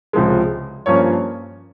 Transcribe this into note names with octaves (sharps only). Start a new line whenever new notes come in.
C#2 C3 F3 G#3
G2 F3 A#3 C#4 C#5